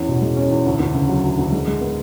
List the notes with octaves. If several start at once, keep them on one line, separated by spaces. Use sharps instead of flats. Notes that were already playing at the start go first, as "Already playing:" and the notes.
Already playing: E2 C#4
B2
G#3
C#4
E2
D2
D2
C#3
F#3
D2
D2
G#3
G#3
B3